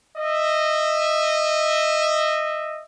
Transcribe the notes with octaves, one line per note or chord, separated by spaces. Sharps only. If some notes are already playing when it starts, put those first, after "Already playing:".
D#5 E5